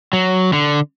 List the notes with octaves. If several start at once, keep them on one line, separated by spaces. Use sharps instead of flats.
F#3
D3